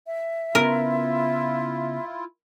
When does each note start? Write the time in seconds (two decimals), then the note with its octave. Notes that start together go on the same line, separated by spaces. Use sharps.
0.07 E5
0.55 C#3 B3 E4 F4 A#4